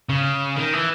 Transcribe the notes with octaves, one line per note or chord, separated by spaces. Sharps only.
C#3
D#3
E3